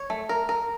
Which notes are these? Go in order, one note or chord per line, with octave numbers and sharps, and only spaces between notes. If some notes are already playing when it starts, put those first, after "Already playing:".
Already playing: C#5
A3
A#4
A#4